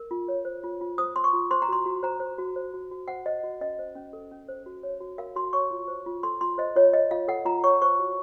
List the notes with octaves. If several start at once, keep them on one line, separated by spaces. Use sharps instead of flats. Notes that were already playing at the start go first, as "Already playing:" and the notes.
Already playing: A#4
F4
C#5
C5
F4
F4
C5 D#6
C5 C6
C#6
F4
C5 C6
A#5
F#4 C6
F#4
C5 A#5
C5
F#4
C5
F#4
F#4
C5 F#5
C5 D#5
F#4
C#4 D#5
C5
C#4
A4
C#4
C5
F#4
C#5
F#4
A#4 F5
F#4 C6
C#5 C#6
F4
C5
F4
A4 C6
F4 C6
C5 D#5
F4 C#5
C#5 D#5
F4 F5
A4 F#5
F4 A#5
C#5 C#6
C5 C#6
F#4